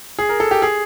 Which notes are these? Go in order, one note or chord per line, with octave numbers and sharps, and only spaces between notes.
G#4
A#4
A4
G4
G#4